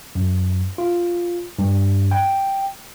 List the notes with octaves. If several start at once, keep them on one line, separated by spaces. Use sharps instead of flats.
F#2
F4
G2
G5